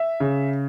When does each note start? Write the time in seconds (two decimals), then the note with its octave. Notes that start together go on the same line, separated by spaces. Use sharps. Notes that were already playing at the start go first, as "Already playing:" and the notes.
Already playing: E5
0.20 C#3